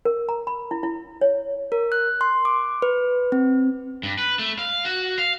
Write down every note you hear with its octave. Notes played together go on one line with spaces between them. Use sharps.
A#4
A#5
B5
E4
E4
C#5
A#4
F#6
C6
D6
B4
C4
G2
B4
A3
F5
F#4
F5